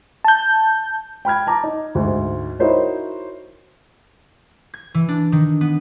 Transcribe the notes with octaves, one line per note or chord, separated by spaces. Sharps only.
A5 G6
G5 B5 F6 G#6
A5 A#5 D6
D#4
D2 G#2
D#4 E4 F#4 A#4 C5 C#5
G#6
E3
D4
D#3
B3